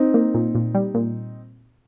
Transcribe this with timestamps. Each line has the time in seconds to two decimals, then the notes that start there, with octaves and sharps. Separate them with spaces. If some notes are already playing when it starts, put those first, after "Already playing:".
Already playing: C4 D#4
0.14 A#3
0.34 A#2
0.55 A#2
0.75 G3
0.94 A#2